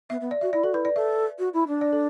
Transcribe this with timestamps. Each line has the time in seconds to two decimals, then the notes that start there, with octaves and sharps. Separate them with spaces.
0.10 B3 E5
0.20 B3
0.31 D5
0.41 F#4 E5
0.53 E4 D5
0.63 F#4 A4
0.73 E4 B4
0.85 D5
0.95 A4 E5
1.38 F#4
1.53 E4
1.68 D4
1.81 D5
1.93 A4